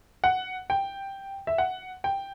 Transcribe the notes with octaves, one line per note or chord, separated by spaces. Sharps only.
F#5
G5
E5
F#5
G5